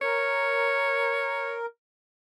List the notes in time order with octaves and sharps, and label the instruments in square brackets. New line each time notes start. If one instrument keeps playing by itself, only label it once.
[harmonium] A#4 [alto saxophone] C#5